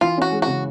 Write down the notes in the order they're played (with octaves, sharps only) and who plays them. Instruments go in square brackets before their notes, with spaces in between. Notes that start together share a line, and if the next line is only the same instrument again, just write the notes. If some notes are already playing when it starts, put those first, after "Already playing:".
[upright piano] E3 [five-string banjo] F4
[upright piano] C#4 [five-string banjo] F#4
[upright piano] G#3
[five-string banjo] F#4
[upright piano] C#3